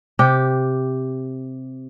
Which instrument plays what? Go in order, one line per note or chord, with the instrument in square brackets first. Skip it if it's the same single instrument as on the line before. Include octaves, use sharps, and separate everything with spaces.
[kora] C3 G4